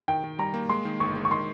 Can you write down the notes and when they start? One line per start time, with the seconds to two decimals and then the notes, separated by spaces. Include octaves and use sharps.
0.08 D#3 G5
0.24 D#3
0.39 G3 A#5
0.54 A#3
0.69 G#3 C6
0.85 D#3
1.00 G1 C#6
1.15 G#3
1.25 C#6
1.31 D#3 C6